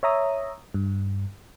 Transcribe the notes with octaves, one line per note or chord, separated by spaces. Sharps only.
C#5 E5 A#5 D#6
G2